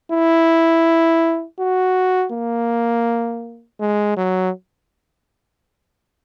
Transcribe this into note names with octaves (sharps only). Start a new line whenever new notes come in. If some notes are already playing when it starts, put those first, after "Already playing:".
E4
F#4
A#3
G#3
F#3